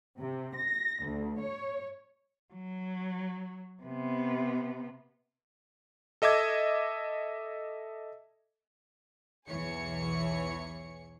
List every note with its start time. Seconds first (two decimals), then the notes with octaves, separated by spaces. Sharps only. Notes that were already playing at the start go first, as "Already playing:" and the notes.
0.18 C3
0.57 A#6
1.06 D2
1.42 C#5
2.54 F#3
3.83 C3 B3
6.22 A4 D#5 E5 D6 G#6
9.47 B1 E2 E3 G#4 C#5 C#7